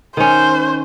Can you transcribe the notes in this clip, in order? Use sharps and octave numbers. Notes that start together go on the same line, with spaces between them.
D#3 C#4 C5